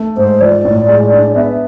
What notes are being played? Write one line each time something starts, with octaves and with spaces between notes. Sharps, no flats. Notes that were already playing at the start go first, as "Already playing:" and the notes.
Already playing: A3
G#2 C5
F3 D5
A2
G#3
D4
B3 E5